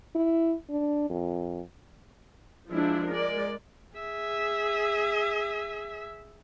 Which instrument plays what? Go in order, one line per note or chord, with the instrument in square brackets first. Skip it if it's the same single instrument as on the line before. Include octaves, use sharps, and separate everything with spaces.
[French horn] E4
D4
F2
[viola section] F3 G#3 D4 E4
G#3 A#4 D5
[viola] G#4 E5